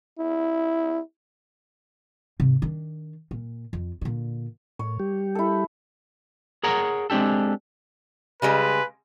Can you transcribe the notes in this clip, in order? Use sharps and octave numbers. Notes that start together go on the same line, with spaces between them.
E4
G#2 C3
D#3 D4
A#2
F2
A#2 D3
A2 C#5
G3 G4
E4 A4
G#4 A#4 C#5 F#5 A#5
G#3 C4 D4 G4 A4
C#3 G3 G#3 B4